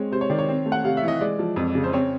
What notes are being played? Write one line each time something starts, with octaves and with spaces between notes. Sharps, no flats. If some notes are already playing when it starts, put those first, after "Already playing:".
Already playing: G#3 C4 C#5
C3 C5
C#5
D#3 D5
C#5
C4
A3
F#5
C3 F5
E5
E3
D#5
G#3 D5
F3
F2
C#3
C5
C4 C#5